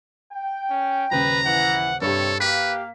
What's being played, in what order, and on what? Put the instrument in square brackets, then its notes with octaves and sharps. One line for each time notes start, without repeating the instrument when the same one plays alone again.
[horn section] G5
[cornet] C#4
[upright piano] D#1 C#3 [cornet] B4 [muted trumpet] A#5
[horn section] E3 [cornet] F#5
[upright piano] G2 G4 [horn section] C3 [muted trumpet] A4 [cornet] C#5
[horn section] A#3 F5 [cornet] G4 [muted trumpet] B4 [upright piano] B6